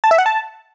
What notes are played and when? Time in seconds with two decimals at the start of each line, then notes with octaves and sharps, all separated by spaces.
0.04 A5
0.11 E5
0.18 F#5
0.26 A5